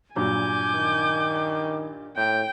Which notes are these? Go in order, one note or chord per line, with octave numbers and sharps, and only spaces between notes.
G2 A#2 F#3 G#5 D6 G6
D#3
A2 G5 G6